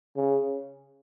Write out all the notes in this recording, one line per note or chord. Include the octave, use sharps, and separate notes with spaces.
C#3